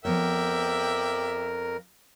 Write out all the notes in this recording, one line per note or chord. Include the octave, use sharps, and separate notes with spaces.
F2 F3 B3 A#4 C#5 D5 E5 G5